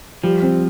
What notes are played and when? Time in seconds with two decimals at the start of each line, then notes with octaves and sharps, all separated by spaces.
0.24 F3 G3
0.42 C4